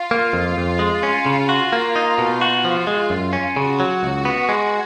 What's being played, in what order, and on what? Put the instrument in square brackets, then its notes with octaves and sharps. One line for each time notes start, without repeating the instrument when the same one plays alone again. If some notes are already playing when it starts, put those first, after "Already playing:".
Already playing: [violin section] F4
[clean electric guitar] A#3
F2
F2
G#3
C#4
C#3
F#4
A#3
D#4
B2
F#4
F3
G#3
F#2
C#4
[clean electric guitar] C#3 [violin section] F#4
[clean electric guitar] F#3
C#2
B3
G#3